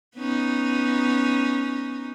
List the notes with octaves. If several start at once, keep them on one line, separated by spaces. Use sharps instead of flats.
B3 C#4 D#4